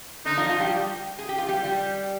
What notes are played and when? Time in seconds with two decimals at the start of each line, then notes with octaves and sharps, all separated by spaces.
0.25 D3 D4 D#4
0.37 F3 F4
0.49 F3 F4
0.60 G3 G4
1.19 G#4
1.29 G4
1.38 F4
1.49 G3 G4
1.64 G3 G4